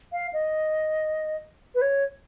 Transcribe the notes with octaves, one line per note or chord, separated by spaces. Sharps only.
F5
D#5
B4
C#5